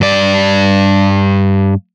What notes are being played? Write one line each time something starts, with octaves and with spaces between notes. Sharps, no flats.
G2 D5